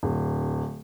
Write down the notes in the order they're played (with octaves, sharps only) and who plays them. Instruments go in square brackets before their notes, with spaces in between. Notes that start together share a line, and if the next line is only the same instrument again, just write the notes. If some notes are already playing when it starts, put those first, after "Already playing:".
[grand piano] D1